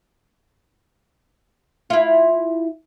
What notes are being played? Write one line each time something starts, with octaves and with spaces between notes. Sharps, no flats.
E4 F4